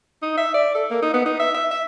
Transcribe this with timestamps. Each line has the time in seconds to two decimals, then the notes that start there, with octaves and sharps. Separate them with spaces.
0.22 D#4
0.38 E5
0.54 D5
0.75 A4
0.90 A#3
1.02 D#4
1.14 B3
1.26 D#4
1.39 E5
1.54 E5
1.71 E5